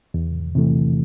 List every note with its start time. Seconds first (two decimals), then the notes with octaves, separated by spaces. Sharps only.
0.14 E2
0.55 C3 E3 A3